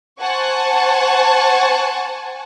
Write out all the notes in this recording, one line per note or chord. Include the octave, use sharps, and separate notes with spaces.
C5 F#5 G#5 A5 C#6